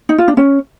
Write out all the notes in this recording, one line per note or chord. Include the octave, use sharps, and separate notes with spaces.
D#4
F4
D4
C#4